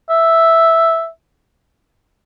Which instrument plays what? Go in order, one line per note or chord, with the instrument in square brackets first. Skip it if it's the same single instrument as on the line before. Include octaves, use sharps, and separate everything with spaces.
[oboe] E5